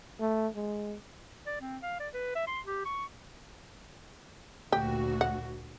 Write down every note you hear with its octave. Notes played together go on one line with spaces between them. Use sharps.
A3
G#3
D5
C4
F5
D5
B4
E5
C6
G4
C#6
D2 A#2 F#4 G4
F#5